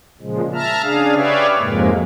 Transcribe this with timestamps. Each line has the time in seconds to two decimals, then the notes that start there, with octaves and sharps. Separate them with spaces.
0.21 A#2 C#3 F3 G#3
0.54 E5 A5 A#5 F6
0.83 C#3 D4 G#4 F5
1.16 G4 B4 C#5 D5 E5 F5
1.58 F2 G#2 C3 G#3 A#3